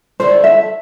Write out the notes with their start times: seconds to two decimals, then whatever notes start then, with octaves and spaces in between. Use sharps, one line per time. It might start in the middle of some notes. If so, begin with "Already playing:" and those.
0.20 D3 A3 E4 C5
0.44 E5